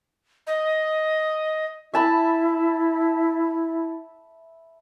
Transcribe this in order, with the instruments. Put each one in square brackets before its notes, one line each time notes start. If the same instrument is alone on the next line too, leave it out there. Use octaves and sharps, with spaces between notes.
[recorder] D#5
[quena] E4 [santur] E5 A5 B5